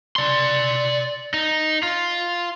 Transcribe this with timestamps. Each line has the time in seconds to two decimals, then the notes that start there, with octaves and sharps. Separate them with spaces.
0.16 D5 C6
1.34 D#4
1.83 F4